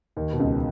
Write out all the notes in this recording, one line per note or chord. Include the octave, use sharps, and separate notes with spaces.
D#2 D#3
B2
C#2 C#3